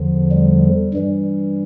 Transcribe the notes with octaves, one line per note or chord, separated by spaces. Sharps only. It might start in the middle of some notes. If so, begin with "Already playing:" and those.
Already playing: E2 D3 F3
G3
G2 E3 G3